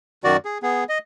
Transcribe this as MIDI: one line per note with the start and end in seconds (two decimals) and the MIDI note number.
0.24 0.37 42
0.24 0.37 51
0.24 0.37 66
0.24 0.37 74
0.45 0.58 68
0.63 0.84 59
0.63 0.84 68
0.89 0.98 75